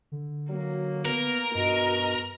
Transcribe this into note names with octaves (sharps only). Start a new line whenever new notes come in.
D3
F#3 A#3
B3 A#4
G2 B2 F#4 D#5